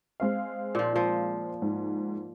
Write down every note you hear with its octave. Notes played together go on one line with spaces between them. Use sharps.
G#3 C4 F5
A#2 F3
F3
G#2